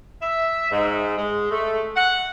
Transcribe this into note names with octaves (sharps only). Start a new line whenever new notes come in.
E5
G#2
G#3
A3
F#5